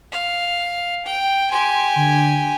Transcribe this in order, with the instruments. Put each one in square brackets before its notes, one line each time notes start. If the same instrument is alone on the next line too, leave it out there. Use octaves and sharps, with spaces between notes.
[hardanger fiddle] F5
G5
[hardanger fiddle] G4 G#5 [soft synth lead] C6
[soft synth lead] D3